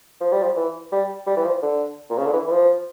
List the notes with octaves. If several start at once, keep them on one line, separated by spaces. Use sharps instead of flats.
F3
G3
F3
E3
G3
G3
E3
F3
D3
A#2
C#3
D3
E3
E3
F3